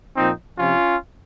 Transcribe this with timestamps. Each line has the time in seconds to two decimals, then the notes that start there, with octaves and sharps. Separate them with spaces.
0.17 A#2 F3 C4 D#4
0.58 C3 F3 C#4 F4